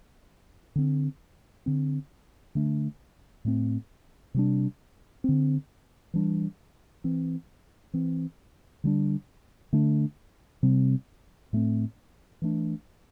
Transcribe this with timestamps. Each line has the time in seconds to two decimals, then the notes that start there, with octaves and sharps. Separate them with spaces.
0.75 D3 C4
1.66 D3 C4
2.55 D3 A3 D4
3.45 A2 A3 C4
4.34 C3 G3 D4
5.24 D3 C4
6.14 E3 G3 D4
7.04 E3 C4
7.93 E3 C4
8.84 D3 G3 D4
9.73 D3 A3 D4
10.63 C3 G3 C4
11.53 A2 A3 C4
12.42 E3 A3 D4